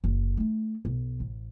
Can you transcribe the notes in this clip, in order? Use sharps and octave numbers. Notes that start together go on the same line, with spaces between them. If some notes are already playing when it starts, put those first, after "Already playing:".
F#1 D3
A3 D#4
B1
A1